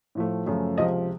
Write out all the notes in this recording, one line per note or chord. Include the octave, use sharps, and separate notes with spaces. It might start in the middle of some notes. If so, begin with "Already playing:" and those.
A2 F3 A3
F#2 C#3 F3 A3
C#2 C3 F3 D#5